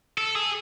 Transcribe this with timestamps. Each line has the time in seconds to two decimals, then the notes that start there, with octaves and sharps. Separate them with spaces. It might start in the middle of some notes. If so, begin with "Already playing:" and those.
0.18 A4
0.35 G#4